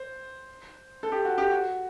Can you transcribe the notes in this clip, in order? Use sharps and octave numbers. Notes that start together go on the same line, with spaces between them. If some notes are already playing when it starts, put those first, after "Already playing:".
Already playing: C5
A4
G4
F#4
G4
F#4